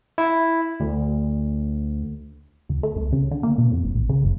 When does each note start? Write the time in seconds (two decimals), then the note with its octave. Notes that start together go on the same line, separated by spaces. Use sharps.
0.18 E4
0.80 D2
2.69 D2
2.83 A3
2.96 C#2
3.12 C#3
3.31 D3
3.43 A#3
3.58 B2
3.71 F2
3.84 G1
3.95 A#1
4.09 C#3
4.24 G1